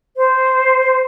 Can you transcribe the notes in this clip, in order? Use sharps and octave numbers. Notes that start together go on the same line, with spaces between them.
C5